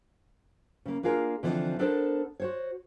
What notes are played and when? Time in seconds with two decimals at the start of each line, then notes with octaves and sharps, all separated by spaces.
0.86 C#3 A#3
1.03 A#3 D4 F4 G#4 A#4
1.43 D3 E3 F3 C4 D#4
1.79 B3 D4 A4 A#4 C5
2.40 F#4 C5 C#5